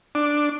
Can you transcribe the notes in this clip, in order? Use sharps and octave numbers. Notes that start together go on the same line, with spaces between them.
D4